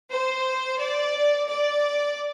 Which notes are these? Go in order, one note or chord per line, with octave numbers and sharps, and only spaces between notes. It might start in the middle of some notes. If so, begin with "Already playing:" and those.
C5
D5
D5